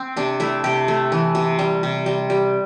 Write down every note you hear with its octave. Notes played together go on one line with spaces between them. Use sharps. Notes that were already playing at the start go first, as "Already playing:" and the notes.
Already playing: C4
C3 D4
A3 E4
C3 G4
A3
E3
C3
G3
C3
G3
G3